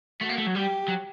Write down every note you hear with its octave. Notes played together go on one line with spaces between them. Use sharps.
A3 F#4
A#3
A3
F#3
G3 G4
F#3